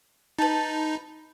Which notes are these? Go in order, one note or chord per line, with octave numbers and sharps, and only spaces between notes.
D#4 B4 A5